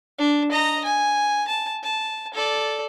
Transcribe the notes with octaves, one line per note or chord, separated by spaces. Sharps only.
D4
D#5 A#5
G#5
A5
A5
A4 D5